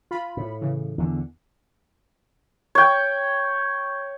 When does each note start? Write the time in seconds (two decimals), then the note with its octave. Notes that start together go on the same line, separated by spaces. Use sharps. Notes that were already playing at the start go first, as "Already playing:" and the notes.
0.11 F4 B5
0.37 A2
0.61 C#3 E3
0.98 E2 D3
2.75 C#5 G5